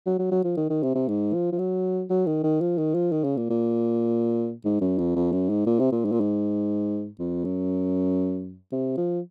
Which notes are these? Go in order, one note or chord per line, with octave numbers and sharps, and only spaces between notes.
F#3
F#3
F#3
F3
D#3
D#3
C3
C3
G#2
F3
F3
F#3
F#3
D#3
D#3
F3
D#3
F3
D#3
C#3
A#2
A#2
G#2
F#2
F2
F2
F#2
G#2
A#2
C3
A#2
G#2
A#2
G#2
F2
F#2
C3
F3